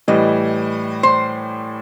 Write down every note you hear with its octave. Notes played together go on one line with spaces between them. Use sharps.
A2 E3 G3 D#5
C5